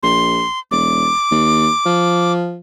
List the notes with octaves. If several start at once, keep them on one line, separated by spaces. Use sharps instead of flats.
A#1 C6
E1 D6
D#2
F3